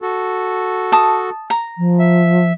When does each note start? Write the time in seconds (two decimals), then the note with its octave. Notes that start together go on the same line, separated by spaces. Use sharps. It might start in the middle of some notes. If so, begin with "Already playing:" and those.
0.02 F#4 A4
0.92 A5 D#6
1.50 A#5
1.78 F3
1.99 E5